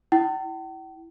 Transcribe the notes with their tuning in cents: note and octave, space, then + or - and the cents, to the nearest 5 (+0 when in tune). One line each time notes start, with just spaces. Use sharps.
E4 +0 G5 -45